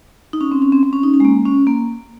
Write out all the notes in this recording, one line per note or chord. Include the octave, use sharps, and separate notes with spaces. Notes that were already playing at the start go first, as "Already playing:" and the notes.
D#4
C#4
C4
C#4
C4
C4
C#4
D#4
C#4
G#3
A#3
C#4
A#3